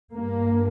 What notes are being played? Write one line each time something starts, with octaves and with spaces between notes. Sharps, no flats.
G2 A#3